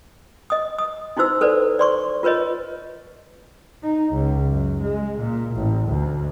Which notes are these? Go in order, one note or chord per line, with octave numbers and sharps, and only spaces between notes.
D#5 D#6
D#6
D#4 E4 F#4 C5 E6
A4 B4 C5 D5
D5 C6 C#6
F4 A#4 B4 C#5 D#5
D#4
C#2
F#2
G#3
A#2
A1
D2